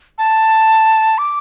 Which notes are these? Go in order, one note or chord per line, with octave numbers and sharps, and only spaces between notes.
A5
D6